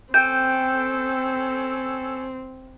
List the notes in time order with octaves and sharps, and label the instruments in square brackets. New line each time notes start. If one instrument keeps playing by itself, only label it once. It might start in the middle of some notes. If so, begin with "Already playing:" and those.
[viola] C4 [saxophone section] C#4 A4 [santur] G5 [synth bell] G6